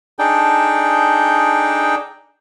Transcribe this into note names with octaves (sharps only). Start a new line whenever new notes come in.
D4 D#4 G#4 A4 G5